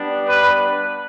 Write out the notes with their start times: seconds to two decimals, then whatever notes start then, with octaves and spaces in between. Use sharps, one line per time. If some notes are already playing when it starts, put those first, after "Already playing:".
Already playing: G3 B3 D4
0.27 B4